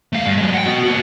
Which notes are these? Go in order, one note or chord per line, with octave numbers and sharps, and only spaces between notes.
A3 F5
G2
F#3 G#3
F#5 G5
B3 F#4
A#3 F#4